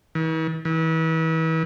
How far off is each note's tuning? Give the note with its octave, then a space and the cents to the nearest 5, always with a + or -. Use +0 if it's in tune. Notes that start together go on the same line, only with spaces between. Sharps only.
E3 -45
E3 -35